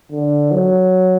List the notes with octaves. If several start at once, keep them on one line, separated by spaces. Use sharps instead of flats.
D3
F#3